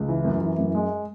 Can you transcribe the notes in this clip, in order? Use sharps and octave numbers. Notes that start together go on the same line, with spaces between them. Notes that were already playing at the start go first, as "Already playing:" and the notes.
Already playing: C#2
E3
F#2
E3
F#2
G#3